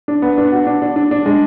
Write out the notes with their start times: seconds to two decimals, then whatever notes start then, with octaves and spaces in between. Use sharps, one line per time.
0.08 D4
0.22 B3
0.38 D4
0.52 F#4
0.67 D4
0.82 D4
0.96 D4
1.11 D4
1.26 G#3